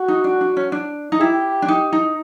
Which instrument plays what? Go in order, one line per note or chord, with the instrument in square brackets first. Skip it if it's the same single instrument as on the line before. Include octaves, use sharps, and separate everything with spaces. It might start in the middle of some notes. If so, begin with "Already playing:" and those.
Already playing: [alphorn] F#4
[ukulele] D#4
D4
D4
C#4
D4
D#4
[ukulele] E4 [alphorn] G4
[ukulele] D4
D#4
D#4